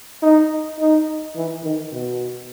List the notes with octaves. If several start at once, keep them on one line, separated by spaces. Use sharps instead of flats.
D#4
D#4
E3
D#3
B2